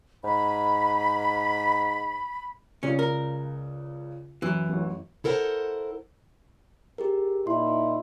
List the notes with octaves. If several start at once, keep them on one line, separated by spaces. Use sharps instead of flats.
G#2 B5
C#2 C#3 C#4 D5
A#4
F#2 E3
A1 F#2
E4 A4 A#4 C5 F#5
G4 G#4 A#4
A#2 D#4 E4 C6